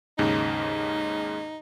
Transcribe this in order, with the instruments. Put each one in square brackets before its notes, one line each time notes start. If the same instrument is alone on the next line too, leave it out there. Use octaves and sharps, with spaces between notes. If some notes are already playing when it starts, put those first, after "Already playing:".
[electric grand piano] D#2 G#2 C#3 [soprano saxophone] D#4